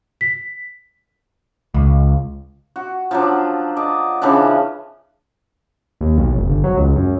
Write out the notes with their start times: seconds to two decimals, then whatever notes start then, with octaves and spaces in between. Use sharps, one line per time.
0.21 B6
1.74 C#2
2.76 F#4
3.11 F3 F#3 D4
3.76 D5 D#5
4.22 C#3 E3 F3 D4
6.01 D#2
6.18 B1
6.35 F1
6.47 G1
6.64 F#3
6.77 C#2
6.96 F#2